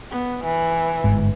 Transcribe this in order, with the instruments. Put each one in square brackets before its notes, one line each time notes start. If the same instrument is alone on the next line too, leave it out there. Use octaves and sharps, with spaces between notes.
[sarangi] B3
E3
[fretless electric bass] G1 G#2